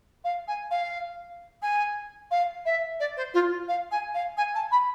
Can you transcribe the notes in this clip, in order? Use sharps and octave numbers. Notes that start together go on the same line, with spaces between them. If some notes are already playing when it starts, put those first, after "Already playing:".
F5
G#5
F5
G#5
F5
E5
D5
C5
F4
F5
G#5
F5
G#5
A5
B5